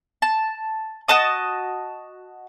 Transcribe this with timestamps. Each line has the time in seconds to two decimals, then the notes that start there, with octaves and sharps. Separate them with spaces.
0.22 A5
1.08 F#4 D#5 A5 D#6